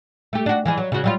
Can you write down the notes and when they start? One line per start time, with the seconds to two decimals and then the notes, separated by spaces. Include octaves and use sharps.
0.33 A3 G4
0.46 D4 F#4
0.65 E3 F3 G#4
0.77 F#3
0.92 C#3 F#4
1.04 F#3 G3 F4